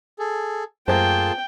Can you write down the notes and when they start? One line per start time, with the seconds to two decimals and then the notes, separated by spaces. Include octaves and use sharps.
0.19 G#4 A4
0.88 F#2 A3 A#3 F4 G#4 C5 G5 A5